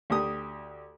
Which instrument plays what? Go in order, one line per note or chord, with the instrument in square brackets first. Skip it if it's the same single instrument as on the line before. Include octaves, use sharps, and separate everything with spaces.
[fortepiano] D2 G4 D#6